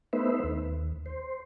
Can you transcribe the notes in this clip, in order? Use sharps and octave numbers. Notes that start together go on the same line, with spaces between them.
A3 B3 D#4 B4 C5 E5
D#2
C5